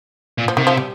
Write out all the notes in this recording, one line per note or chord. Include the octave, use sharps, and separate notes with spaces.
A#2
F3
C3 D#3
F3
G3